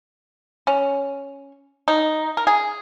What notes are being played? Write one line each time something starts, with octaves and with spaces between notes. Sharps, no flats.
C#4
D#4
A#4
G#4